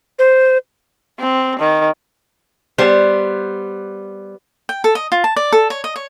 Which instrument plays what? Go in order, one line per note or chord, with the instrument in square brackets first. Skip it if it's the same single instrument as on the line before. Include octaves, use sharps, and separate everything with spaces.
[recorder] C5
[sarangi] C4
D#3
[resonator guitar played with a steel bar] G3 B3 C5
[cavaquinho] G5
A4
D#5
F4
A5
D5
A4
C#5
D#5
C#5